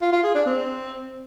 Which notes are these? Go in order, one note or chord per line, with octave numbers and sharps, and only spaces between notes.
F4
F4
G#4
D4
C4